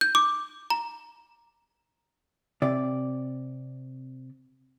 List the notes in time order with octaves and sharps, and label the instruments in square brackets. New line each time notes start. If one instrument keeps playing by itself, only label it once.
[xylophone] G6
D6
A#5
[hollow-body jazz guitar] C3 D5